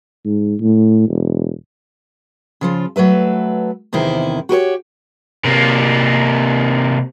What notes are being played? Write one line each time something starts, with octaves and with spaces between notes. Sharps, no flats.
G#2
A2
E1
C#3 F3 F4
F#3 A3 B4 E5
E2 C3 D#3 E4 C5
F#4 G4 B4 C#5
C3 A#3